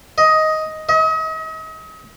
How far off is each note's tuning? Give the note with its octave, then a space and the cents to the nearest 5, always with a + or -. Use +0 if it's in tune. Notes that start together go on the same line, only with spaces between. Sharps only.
D#5 +10
D#5 +40